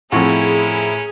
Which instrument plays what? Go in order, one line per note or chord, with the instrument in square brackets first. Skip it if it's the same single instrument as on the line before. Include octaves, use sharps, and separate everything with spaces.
[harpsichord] F2 F#4 [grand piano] A2 [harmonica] C#4 E4 A#4 [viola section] G#4